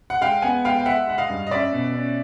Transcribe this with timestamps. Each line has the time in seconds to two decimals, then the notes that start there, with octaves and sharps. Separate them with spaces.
0.10 F#5
0.21 G#3 F5 G5
0.42 B3 F#5 G#5
0.65 G#3 F5 G5
0.78 G5
0.86 G#3 E5 F#5
1.07 G#3 F#5
1.18 D#5 F5
1.29 G2
1.47 D#5
1.51 C#4 D5 E5
1.73 B2
1.94 C#4